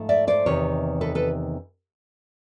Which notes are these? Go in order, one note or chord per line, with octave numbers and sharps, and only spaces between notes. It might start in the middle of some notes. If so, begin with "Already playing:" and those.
Already playing: G#2 F3 A3
D5 E5
C5 D5
E2 C3 D#3 C#5
A4 B4
A4 B4